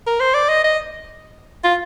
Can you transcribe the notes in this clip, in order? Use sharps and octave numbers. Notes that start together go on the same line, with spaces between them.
A#4
C5
D5
D#5
D#5
F4